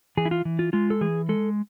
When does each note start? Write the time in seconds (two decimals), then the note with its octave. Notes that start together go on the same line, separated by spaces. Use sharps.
0.17 E3 G#4
0.25 E4
0.31 F4
0.45 E3
0.59 F4
0.73 G#3 F4
0.90 A4
1.01 E3 G#4
1.29 G#3 A4